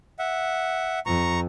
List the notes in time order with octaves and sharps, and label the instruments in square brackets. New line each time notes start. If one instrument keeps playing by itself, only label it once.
[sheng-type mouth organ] E5 F#5
[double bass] F2 [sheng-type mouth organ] A#5 C#6